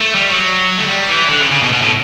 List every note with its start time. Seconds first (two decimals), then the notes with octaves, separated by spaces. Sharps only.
0.01 A3
0.15 G3
0.29 F#3
0.78 A3
0.87 G3
1.09 E3
1.30 D3
1.41 C#3
1.51 C#3
1.62 B2
1.73 B2
1.81 A2